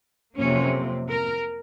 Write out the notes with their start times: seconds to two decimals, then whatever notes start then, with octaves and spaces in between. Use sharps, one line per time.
0.36 F2 C3 F#3 A#3 C#4
1.10 A#4